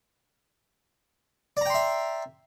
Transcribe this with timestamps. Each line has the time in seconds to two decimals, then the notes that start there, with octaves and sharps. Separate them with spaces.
1.57 D5
1.61 A#5
1.66 G5
1.70 C6
1.74 E5